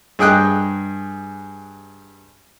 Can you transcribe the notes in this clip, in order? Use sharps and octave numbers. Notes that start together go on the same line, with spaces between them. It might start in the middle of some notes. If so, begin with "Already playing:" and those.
G2 G#4 D#5 G5 F#6